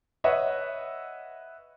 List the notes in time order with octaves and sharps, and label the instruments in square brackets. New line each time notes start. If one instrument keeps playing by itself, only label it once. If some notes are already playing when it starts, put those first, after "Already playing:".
[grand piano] B4 C#5 D#5 E5 F#5